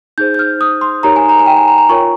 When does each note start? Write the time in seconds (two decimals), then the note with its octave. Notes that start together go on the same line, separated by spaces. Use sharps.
0.18 D#4 G#4 C5 G6
0.34 G6
0.39 F6
0.61 D#6
0.81 C6
1.03 D#4 G4 A#4 C#5 A#5
1.16 G#5
1.29 A#5
1.39 G#5
1.46 G5
1.57 G#5
1.68 A#5
1.78 A#5
1.89 F4 A#4 C#5 C#6